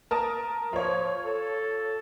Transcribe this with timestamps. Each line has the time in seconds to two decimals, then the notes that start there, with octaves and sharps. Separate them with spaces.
0.11 A#4 A5 D#6
0.73 F3 F4 C#5
1.25 A4